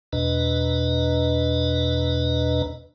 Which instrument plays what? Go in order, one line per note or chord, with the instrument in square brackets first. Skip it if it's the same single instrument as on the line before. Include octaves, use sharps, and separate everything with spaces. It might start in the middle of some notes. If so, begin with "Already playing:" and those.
[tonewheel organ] E2 B2 D4 B4 D#5 A#5